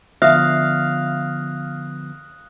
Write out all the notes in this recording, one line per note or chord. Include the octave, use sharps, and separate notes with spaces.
D3 F3 B3 E5 F5 D#6 F#6 A#6